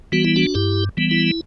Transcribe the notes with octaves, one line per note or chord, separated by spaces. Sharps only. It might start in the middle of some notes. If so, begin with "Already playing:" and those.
E3 G3 B3 F#4
E4
D4 F#4
G2 E4 G4
E3 G3 B3
E4